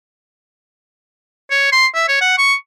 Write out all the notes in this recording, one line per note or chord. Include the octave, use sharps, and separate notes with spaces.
C#5
C6
E5
C#5
F#5
C#6